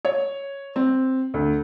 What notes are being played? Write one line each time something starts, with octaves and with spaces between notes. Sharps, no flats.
C#5
C4
D2